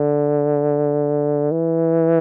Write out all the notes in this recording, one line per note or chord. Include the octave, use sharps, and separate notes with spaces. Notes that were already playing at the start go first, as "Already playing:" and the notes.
Already playing: D3
E3